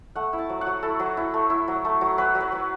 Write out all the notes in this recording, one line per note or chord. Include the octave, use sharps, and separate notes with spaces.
A3 F#5
E4
A5
F#3
F#5
F#3
E4 A4
F#3
E4
A3
E4
F#3
A3
F#3
F#3 B4
F#3
B4
F#3